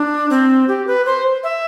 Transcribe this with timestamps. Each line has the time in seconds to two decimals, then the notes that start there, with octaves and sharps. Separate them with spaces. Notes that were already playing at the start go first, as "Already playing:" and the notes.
Already playing: D4
0.30 C4
0.68 G4
0.87 B4
1.06 C5
1.44 E5